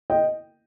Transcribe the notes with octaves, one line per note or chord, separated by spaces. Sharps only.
D#5 G5